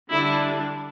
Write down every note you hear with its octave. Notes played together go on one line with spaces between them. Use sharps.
D3 G3 D4 E4